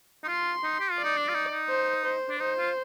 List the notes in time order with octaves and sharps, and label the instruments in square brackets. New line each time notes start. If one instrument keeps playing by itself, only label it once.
[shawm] D#4
[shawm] F4 [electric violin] C6
[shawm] D#4
G4
F4
[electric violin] D5
[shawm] D#4
D4
F4
D#4
D#4
[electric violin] C5
C5
[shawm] D4
[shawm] D#4 [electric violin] C5
[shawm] F4